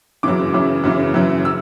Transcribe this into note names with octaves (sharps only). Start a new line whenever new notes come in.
F#2 C#3 E3 D6
F#2 C#3 E3
F#2 C#3 E3
F#2 C#3 E3
E6